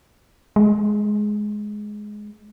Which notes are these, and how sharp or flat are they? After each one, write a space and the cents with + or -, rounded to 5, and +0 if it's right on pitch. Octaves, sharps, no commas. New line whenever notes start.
G#3 +10